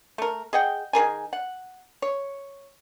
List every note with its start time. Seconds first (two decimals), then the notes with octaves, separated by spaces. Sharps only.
0.18 A3 A#4
0.53 G#4 D#5 F#5 G5
0.93 D#3 G#4 A#4 G#5
1.33 F#5
2.02 C#5